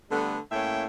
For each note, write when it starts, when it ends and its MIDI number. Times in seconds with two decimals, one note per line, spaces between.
0.11 0.38 50
0.11 0.38 55
0.11 0.38 57
0.11 0.38 59
0.52 0.86 45
0.52 0.86 58
0.52 0.86 61
0.52 0.86 76
0.52 0.86 79